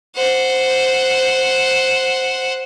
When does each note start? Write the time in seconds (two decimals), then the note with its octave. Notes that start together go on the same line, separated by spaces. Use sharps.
0.16 C5 F#5